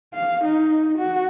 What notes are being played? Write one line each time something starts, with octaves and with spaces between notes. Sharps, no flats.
F5
D#4
F#4